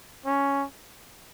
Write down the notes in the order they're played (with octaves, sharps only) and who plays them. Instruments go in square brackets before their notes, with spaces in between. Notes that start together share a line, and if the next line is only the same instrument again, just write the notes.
[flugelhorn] C#4